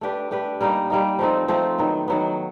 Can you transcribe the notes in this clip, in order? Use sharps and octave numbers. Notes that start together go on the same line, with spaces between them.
A3 D4 G4 B4
A3 D4 G4 B4
G3 A#3 D#4
G3 A#3 D#4
F3 A3 C4 D#4
F3 A3 C4 D#4
D#3 F#3 B3
D#3 F#3 B3